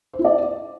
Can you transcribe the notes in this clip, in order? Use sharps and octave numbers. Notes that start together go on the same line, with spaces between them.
C5
E4
D5